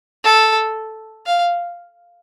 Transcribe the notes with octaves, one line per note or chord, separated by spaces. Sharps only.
A4
F5